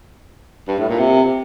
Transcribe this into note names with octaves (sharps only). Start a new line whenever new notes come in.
G2
A2
A#2
C3